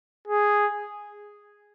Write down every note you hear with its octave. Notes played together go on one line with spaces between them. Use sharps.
G#4